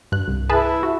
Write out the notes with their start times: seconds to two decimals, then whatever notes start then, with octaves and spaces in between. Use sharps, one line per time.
0.12 G2 F#6
0.27 C2
0.50 E4 G#4 B4 A5
0.83 F#4